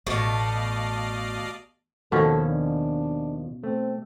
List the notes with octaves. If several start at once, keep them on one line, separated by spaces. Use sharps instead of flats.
A1 B2 A3 D5 D#5 F5
D#2 B2 D#3 F3 C#4 A4
D4
A3 C4